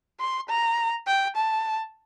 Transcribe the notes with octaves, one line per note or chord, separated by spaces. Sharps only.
C6
A#5
G5
A5